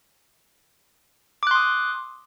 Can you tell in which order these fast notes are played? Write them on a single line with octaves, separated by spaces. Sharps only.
D6 F#6 C6 D#6